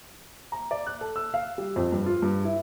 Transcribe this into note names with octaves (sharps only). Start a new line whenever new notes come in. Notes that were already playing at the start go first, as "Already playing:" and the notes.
A#5
D5
F#6
A4
E6
F5
G3
F2
G2
F4
G2
E4